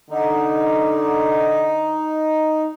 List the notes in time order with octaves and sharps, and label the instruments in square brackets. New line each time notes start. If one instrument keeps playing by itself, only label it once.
[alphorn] D3 [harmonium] D#4